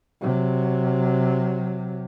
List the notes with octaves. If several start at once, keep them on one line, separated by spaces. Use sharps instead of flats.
C3 F#3